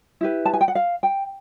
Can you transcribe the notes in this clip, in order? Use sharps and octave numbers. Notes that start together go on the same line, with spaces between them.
E4 G4 B4
A5
G#5
G5
F#5
F5
G5